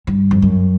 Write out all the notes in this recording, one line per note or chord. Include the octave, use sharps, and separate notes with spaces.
G2
F2
F#2